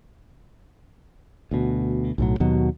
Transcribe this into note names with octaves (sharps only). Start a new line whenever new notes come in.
D2 B2
B1 A2 F#3
D#2 B2 F#3